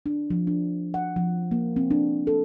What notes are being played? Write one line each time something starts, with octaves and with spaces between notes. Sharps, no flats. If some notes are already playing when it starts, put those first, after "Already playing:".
D4
F3
D4
F#5
F3
A#3
C4
D4
A4